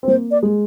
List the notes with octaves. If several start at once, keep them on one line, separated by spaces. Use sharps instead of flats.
C4
A#3 C5
D5
G#3